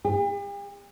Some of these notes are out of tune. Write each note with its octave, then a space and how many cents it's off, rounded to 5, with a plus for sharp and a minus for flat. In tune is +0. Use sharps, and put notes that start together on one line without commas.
G4 +45